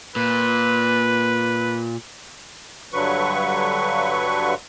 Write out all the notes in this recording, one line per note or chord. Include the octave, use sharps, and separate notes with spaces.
A#2 B4
G2 D3 F#3 B4 C#6